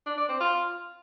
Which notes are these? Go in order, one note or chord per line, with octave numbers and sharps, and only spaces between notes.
D4
D5
C4
F4